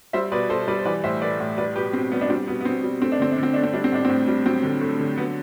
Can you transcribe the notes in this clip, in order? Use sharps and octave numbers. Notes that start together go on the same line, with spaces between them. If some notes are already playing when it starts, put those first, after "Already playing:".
G3 C5 E5
B2 B4 D5
B2 A4 C5
G3 B4 D5
C5
E3 B4 D5
A2 C5 E5
A3 B4 D5
A2
G3 B4 D5
B2 G4 B4
B2 C4
G3 B3
D4
G3 C4
B2 B3
B3
B2 C4
G3
A3 C4
D4
D3 C4
D4
D3 C4
A3 D4
C4
G3 D4
C4
A2 D4
A2 C4
G3
F#3 C4
D3
A3
D3
F#3 B3